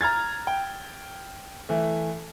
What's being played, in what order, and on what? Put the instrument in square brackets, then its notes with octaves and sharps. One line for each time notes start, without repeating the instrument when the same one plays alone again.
[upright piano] A#5 F6 G#6 A6
G5
E3 A3